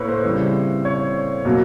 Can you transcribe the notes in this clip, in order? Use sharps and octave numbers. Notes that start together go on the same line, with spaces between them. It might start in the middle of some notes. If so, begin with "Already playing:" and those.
Already playing: A2 A#3 B4 C#5
C5
C#3 E3 G3 C4
C#5
B2 F#3 A#3